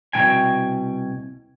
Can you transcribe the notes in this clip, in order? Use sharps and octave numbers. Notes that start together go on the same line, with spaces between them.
C2 B2 F3 D4 G5 G#5